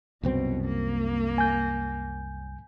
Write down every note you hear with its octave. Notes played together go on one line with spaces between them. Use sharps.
C2 F#2 B2 C4
A#3
G#5 G6